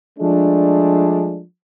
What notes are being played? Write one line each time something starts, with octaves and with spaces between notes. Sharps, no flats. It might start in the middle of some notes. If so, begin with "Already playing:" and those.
F3 G#3 A3 D4